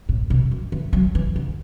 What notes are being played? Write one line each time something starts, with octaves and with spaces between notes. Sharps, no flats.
A2
B2
F#2
E3
F#3
E3
D3